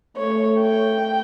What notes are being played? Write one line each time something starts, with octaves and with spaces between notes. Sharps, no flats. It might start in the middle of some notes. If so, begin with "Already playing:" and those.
A3 C#5
G5